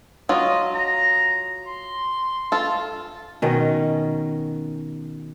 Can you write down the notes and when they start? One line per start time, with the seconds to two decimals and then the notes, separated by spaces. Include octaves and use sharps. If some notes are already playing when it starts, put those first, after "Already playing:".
0.29 F#3 F4 D#5
0.75 A#5
1.66 C6
2.52 F4 A4
3.42 B2 D#3 C#4 D#5